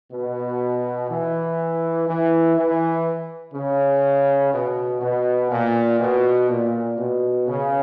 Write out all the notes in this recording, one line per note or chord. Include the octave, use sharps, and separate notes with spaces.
B2
E3
E3
E3
C#3
B2
B2
A#2
B2
A#2
B2
C#3